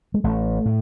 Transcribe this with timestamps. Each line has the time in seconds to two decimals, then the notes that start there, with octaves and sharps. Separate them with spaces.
0.14 G#3
0.24 A1 A3
0.66 A2